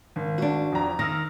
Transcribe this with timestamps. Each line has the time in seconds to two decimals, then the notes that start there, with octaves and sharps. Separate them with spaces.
0.16 G#1
0.38 D4 F#4
0.72 F2 A#5
0.99 D#3 E6 F6 A#6